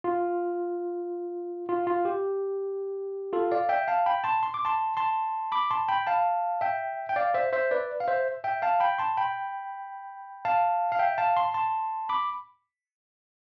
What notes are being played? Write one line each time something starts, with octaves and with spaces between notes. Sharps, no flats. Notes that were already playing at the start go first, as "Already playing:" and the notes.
F4
F4
F4
G4
F4 A4
D5 F5
E5 G5
F5 A5
G5 B5
A5 C6
C6
D6
A5 C6
A5 C6
B5 D6
A5 C6
G5 B5
F5 A5
E5 G5
G5
D5 F5
C5 E5
C5 E5
B4 D5
F5
C5 E5
E5 G5
F5 A5
G5 B5
A5 C6
G5 B5
F5 A5
F5
E5 G5
F5 A5
A5 C6
A5 C6
B5 D6